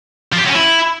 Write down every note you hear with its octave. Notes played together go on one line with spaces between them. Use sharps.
F3
G4
F#3
C#4
E4